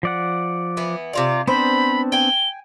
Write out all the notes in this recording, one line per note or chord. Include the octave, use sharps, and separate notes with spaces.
F3 D5 F#5
E3 B3
C3 F4 D5
B3 C4 D4 C5 B5
G5 G#5 G7